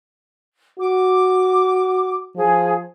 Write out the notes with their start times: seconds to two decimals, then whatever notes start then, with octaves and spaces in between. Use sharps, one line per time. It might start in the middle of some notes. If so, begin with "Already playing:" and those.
0.79 F#4 D6
2.36 F3 G#4